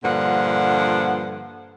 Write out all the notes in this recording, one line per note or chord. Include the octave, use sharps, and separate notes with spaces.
G2 A#2 D3 F3 F#5